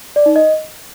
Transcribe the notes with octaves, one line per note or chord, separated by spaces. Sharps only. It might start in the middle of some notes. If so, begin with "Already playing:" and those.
D5
D#4
D#5